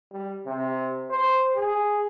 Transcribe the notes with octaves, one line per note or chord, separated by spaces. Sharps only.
G3
C3
C5
G#4